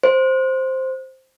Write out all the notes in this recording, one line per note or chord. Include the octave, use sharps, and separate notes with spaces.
C5